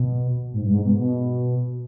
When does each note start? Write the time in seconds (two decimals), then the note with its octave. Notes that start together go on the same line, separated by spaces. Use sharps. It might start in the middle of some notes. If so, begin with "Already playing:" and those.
Already playing: B2
0.53 G#2
0.64 G2
0.74 G#2
0.85 B2
0.95 B2